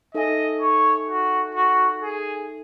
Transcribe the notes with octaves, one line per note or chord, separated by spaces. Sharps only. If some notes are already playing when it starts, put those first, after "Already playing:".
D#4 A4 D#5 E5 G#5
C#5
F#4
F#4
G#4